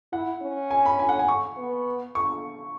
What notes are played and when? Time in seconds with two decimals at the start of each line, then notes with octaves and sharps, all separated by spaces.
0.12 E4 F#5
0.42 C#4
0.71 G#5
0.86 B5
0.99 G#5
1.09 F#5
1.19 G#5
1.28 C#6
1.57 B3
2.15 C#6